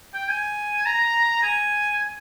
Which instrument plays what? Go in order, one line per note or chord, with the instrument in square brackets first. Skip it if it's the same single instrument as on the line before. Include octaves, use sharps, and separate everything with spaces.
[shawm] G5
G#5
A#5
G#5